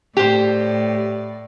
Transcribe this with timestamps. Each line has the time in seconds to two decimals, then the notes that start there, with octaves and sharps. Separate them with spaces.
0.17 A2 G4 C5 D5